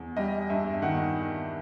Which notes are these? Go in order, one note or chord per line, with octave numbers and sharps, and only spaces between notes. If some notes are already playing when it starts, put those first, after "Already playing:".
Already playing: E2
G3 D#5
G2 E5
D#3 F#5